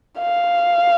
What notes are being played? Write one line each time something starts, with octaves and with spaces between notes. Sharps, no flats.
F5